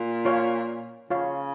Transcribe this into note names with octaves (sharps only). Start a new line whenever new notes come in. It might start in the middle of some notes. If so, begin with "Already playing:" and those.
Already playing: A#2
F4 C#5 F5
C#3 F4 C#5 F5